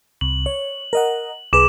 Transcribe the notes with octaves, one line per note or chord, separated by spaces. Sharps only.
C2 F#7
C#5
A#4 D#5 F#5
B1 G#4 B4 D6 E7